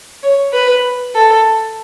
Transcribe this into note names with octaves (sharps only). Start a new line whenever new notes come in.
C#5
B4
A4